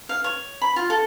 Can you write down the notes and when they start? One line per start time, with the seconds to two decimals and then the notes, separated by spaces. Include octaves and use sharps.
0.09 F5
0.24 C#5
0.61 B5
0.76 F4
0.90 A4